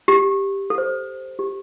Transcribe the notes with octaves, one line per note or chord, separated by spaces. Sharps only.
G4
A4
C5
G4